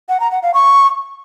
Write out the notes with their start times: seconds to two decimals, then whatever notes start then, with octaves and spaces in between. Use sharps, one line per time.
0.09 F#5
0.20 A#5
0.31 F#5
0.43 F5
0.54 C#6